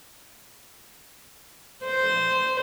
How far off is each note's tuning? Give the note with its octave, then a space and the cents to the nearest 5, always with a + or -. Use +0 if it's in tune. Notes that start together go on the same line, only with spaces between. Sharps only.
C5 -10